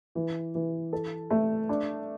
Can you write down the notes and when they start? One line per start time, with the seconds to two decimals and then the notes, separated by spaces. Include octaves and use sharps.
0.15 E3
0.55 E3
0.93 A4
1.31 A3
1.69 D4